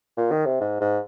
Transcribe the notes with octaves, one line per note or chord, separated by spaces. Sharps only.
A#2
D#3
C3
G#2
G#2